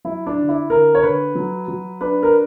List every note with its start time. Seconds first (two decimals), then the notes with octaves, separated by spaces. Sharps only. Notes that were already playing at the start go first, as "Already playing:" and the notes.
0.04 F#3 E4
0.26 D4
0.37 D3
0.49 E4
0.70 D3 A#4
0.95 C#5
1.03 D3 B4
1.35 F#3
1.68 F#3
2.01 D4 B4
2.23 A#4